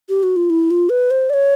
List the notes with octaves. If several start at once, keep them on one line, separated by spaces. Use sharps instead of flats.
G4
F#4
F4
E4
F4
B4
C5
D5
C#5